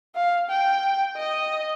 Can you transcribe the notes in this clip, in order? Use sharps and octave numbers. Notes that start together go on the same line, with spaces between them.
F5
G5
D#5